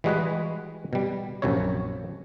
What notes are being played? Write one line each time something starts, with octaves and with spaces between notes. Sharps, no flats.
E3 G3 G#3 F#4 G#4 B4
B2 G3
A#1 F#2 C3 E4 C#5